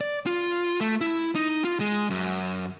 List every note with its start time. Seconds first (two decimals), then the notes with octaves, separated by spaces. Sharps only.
0.01 D5
0.26 F4
0.81 A3
1.01 E4
1.35 D#4
1.65 F4
1.80 G#3
2.10 F#2